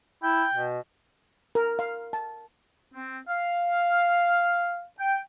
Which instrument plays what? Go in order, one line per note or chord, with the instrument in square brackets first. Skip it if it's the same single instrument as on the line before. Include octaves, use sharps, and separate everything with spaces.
[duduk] E4 [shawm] G5
[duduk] B2
[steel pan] A#4
F5
A5
[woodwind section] C4
F5
G5